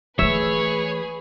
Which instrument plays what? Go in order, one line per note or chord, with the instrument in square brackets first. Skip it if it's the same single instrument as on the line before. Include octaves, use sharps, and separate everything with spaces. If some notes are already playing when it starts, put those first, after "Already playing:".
[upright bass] E3 A3 [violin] G#4 B4 [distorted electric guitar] C#5 [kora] E5